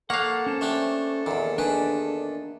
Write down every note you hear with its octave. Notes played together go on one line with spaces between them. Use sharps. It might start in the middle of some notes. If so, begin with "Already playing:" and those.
A#3 A4 C#5 F5 F#5 F#6
C#4 C5 A5
A3 D4 G4
E2 A#2 D#3
D#3 D4 G#4 B4